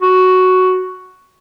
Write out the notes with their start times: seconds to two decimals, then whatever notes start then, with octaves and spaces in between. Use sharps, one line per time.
0.02 F#4